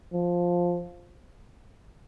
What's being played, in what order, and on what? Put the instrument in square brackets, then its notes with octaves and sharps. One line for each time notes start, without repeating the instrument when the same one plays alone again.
[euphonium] F3